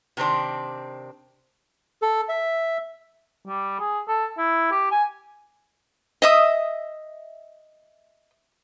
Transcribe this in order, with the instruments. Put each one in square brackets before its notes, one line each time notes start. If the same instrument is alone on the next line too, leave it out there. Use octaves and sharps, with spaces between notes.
[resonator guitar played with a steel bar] C3 D#3 C4 D4
[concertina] A4
E5
[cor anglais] G3
G#4
A4
E4
G4
G#5
[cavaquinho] D#5 E5 D#6